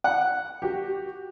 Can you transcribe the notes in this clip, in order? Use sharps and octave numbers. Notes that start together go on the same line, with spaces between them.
F#5
F#4 G4